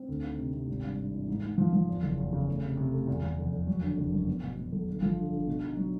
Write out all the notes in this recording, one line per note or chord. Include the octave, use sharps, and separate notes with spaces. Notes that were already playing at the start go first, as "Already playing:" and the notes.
Already playing: C4
D2
D#3
C3
C3
G#1
G2
G2
E3
G#2
G#2
F3
F3
E2
F#1
E2
C#3
A3
C3
C3
A3
E2
E2
F1
F1
F#3
D3
F#1
F#2
B3
B2
B2
B1
G1
F3
D3
D3
B2
D#4
F#3